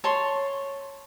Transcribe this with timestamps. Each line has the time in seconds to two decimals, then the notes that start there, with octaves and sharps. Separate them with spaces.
0.04 C#5 A5 C6